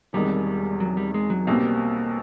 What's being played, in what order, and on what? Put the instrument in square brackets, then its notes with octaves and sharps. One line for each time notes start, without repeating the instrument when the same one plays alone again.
[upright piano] E1 E2 C3 D#3 G#3 [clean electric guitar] G3
[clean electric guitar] F#3
G3
G#3
F#3
[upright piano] B1 B2 G3 C4 [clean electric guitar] A#3